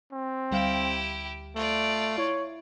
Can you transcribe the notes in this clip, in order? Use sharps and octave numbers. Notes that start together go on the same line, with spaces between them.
C4
D2 G3 E4 G4 F5
A3 F4 D5
E4 C#5